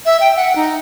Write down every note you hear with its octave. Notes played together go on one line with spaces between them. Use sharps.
E5
G5
F#5
D#4